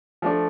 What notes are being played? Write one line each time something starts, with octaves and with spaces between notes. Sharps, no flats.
F3 A3 D4